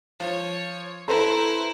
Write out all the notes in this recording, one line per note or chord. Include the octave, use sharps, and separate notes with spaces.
F3 C#5
E4 A4 B4 C5 A#5